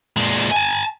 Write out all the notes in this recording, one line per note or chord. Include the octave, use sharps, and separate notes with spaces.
A#2 G#3
G#5 A5